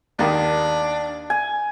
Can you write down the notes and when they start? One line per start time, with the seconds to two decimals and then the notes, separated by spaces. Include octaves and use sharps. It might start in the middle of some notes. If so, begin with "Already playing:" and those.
0.19 D#2 D#3 D4
1.30 G#5